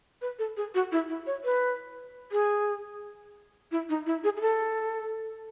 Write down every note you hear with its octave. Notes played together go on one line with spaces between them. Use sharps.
B4
A4
G#4
F#4
E4
E4
C#5
B4
G#4
E4
D#4
E4
G#4
G#4
A4